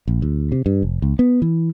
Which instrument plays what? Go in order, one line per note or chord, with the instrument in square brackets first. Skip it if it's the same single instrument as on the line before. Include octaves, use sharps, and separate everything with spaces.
[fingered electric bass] A#1
D2
C3
G2
F1
C#2
B3
E3